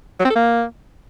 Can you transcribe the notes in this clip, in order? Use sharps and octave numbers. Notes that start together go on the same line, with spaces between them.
F#3
C4
A4
A#3